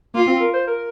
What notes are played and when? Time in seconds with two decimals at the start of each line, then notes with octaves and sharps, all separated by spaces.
0.14 A#3 F4
0.27 C4
0.40 A#4
0.54 C5
0.67 A#4